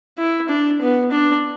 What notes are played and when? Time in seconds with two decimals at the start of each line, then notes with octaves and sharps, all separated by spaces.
0.18 E4
0.49 D4
0.81 B3
1.12 D4